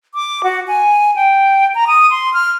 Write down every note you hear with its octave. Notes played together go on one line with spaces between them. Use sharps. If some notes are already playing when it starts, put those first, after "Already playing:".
D6
F#4
G#5
G5
A#5
D#6
C6
F6